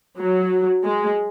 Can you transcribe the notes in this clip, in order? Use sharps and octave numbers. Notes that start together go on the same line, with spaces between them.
F#3
G#3